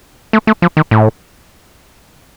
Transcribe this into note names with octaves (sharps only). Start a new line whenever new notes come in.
A3
A3
F3
D#3
A2